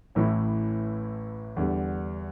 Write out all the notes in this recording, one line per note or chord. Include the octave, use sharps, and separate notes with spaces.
A1 A2 E3 A3 E4
E2 D3 G3